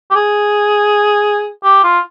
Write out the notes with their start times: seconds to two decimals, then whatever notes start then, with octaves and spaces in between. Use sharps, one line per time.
0.11 G4
0.16 G#4
1.64 G4
1.84 F4